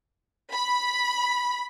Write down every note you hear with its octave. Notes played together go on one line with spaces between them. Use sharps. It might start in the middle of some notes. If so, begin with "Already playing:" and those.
B5